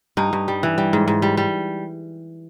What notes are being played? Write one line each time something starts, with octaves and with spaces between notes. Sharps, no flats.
G2 D#4
G2
G3
E3
G3
G#2
G#2
G3
G3